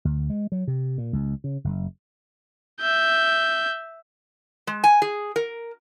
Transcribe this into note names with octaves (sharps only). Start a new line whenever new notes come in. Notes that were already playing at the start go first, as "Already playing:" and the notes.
D2
G#3
F#3
C3
A#2
C#2
C#3
F#1
E5 G6
G#3
G#5
G#4
A#4